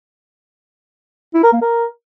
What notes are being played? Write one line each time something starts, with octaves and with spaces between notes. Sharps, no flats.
E4
A#4
A#3
A#4